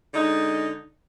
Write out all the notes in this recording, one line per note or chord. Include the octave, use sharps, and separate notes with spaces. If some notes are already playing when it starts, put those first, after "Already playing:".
D3 G#3 D#4